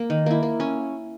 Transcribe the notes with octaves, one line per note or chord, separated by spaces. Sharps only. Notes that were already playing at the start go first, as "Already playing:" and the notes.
Already playing: A#3
D#3
A#3 E4
A#3
C#4